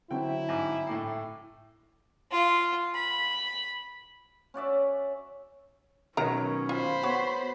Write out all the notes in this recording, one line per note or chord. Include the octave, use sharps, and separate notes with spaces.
D3 F#3 C4 E4 G5
G#2 G#5 A#5 D6
A2 A3 G5 D6 C7
F4
B5
C#4 F#4 D5 E5
B2 D#3 F#3 C#4 A#4 A#5
F4 C5 B5
B3 F#4 C#5